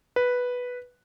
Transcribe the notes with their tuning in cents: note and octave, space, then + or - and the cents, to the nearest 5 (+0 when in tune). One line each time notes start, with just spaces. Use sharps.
B4 -5